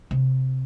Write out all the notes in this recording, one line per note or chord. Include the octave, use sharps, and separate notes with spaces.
C3